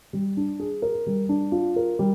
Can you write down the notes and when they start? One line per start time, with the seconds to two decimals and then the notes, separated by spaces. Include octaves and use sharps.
0.13 G3
0.37 D4
0.60 G#4
0.82 A#4
1.06 G3
1.29 D4
1.52 F4
1.76 A#4
1.99 G3